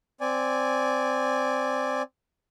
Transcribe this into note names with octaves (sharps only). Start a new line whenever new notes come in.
C4 D5 G#5